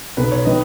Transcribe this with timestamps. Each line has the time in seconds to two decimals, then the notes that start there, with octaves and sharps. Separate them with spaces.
0.17 B1 B2 B3 B4
0.31 C#5
0.45 D#3 B3 D#5